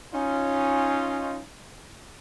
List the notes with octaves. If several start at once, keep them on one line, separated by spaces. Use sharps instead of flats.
C#4 D#4 F4